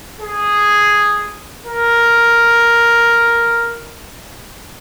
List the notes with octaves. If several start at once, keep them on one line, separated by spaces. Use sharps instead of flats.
G#4
A#4